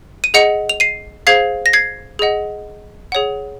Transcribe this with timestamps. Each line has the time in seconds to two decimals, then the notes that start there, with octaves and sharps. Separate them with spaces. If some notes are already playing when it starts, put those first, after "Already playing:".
0.24 D#7
0.34 G#4 D#5 F#5 C#7 F7
0.69 F7
0.80 C7 D#7
1.27 G#4 C5 F5 G#6 C7
1.66 A#6
1.73 G#6 C7
2.19 G#4 D#5 F#5
3.12 G#4 C#5 F#5